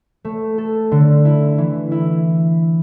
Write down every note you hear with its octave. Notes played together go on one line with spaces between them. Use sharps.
A3
A4
D3
E4
E3
E4